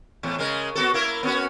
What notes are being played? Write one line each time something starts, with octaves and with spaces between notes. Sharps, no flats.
E2 A2
C#3 G#3 A#4
B3 F#4 A4
A#3 E4 A#4
B3 C#4 F#4